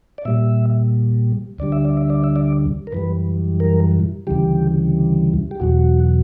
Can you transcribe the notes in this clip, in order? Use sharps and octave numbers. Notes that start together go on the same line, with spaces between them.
D5
A#2 G3 E5
D2 D3 G3 D5
E5
D5
E5
D5
E5
D5
A#4
F#2 E3 G3 B4
A#4
D2 C#3 E3 G3 G4
G4
E2 B2 F#3 F#4